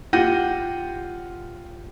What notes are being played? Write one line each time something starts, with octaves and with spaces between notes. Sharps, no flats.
F4 G4 F#5 G6 A#6 D#7